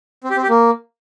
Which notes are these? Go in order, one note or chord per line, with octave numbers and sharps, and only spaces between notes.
C4
G4
C4
G4
A#3